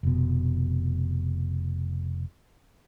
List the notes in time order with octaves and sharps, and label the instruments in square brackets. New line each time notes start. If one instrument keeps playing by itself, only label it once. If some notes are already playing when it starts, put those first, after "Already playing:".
[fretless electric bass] F1 B2